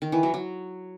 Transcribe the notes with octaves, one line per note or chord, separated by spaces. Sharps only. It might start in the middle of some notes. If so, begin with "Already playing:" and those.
D#3
E3
F#3
F#3